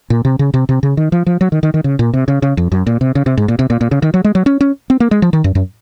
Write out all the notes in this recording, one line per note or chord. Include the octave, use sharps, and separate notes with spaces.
A#2
C3
C#3
C3
C3
C#3
D#3
F3
F3
F#3
D#3
D#3
D#3
C#3
A#2
C3
C#3
C#3
F2
F#2
A#2
C3
C#3
C3
G#2
A#2
C3
A#2
A#2
C#3
D#3
F#3
G#3
F#3
C#4
C#4
C4
A#3
G#3
F3
D#3
F#2
F#2